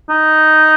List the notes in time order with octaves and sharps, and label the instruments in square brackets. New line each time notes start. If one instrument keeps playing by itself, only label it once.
[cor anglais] D#4